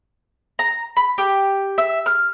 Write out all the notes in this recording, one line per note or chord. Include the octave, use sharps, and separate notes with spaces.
A#5
B5
G4
E5
F6